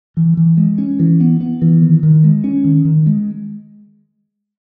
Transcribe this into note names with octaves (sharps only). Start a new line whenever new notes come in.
E3
E3
G#3
C#4
E3
B3
B3
E3
D#3
D#3
G#3
C#4
D#3
D#3
G#3